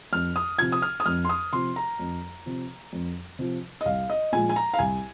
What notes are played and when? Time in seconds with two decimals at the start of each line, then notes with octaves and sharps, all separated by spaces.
0.13 F2 F6
0.36 D#6
0.59 C3 F3 G#6
0.72 D#6
0.82 F6
1.00 D#6
1.06 F2 F6
1.25 C6
1.29 D#6
1.53 C3 F3 C6
1.76 A#5
1.99 F2
2.46 C3 F3
2.93 F2
3.39 C3 F3
3.81 D#5
3.85 C2 F5
4.10 D#5
4.32 A#2 F3 G#3 G#5
4.49 G#5
4.56 A#5
4.74 F5
4.79 C2 G#5